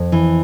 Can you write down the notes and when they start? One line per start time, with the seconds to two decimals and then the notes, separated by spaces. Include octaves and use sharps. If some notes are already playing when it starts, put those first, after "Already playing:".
Already playing: F2
0.12 E3